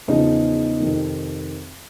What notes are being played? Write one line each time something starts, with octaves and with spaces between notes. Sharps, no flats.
E2 C#3 F3 D#4
F2 C3 D#3